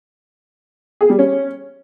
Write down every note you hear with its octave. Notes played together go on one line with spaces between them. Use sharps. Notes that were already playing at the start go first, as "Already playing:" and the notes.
G#4
G3
C#4